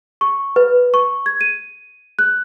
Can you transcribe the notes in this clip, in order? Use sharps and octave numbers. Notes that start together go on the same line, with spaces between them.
C#6
B4
C#6
G#6
D#7
F#6